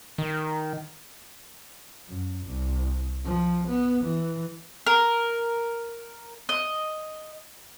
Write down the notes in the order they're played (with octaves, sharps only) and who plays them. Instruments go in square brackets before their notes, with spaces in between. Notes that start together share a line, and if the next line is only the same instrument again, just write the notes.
[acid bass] D#3
[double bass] F#2
C2
F3
B3
E3
[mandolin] A#4
D#5